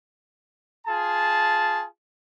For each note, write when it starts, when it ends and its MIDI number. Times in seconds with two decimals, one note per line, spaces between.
0.87 1.85 65
0.87 1.85 68
0.87 1.85 81